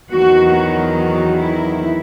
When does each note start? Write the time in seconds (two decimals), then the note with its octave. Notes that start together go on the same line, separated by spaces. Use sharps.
0.10 E2 D#3 F#3 F#4
0.96 F#4
1.39 E4